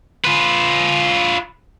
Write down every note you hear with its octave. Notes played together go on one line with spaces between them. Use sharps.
F4 B4